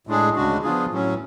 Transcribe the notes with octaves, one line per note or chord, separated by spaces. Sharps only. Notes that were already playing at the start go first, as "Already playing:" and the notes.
A2 G#3 D4 G#4
D2 C#3 G#3 D4 F#4
F3 B3 D4 F4 G#4
A2 F#3 C#4